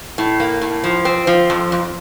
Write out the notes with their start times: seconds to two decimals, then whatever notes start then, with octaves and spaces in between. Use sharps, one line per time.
0.18 A2
0.40 A#3
0.61 A2
0.84 F3
1.05 C4
1.27 F3
1.50 F2
1.72 F2